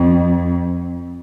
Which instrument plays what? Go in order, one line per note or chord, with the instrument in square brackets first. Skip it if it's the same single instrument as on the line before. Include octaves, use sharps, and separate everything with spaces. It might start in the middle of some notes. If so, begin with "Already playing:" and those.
Already playing: [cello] F2